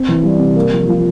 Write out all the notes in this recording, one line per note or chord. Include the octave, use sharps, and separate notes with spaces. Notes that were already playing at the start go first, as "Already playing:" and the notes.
Already playing: C4
E3
G3
C3
A#3
F3
F3